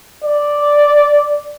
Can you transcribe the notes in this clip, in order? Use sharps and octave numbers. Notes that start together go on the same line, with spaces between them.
D5